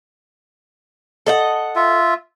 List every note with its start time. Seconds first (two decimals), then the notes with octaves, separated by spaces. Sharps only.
1.27 A4 D#5 F#5
1.76 F4 E5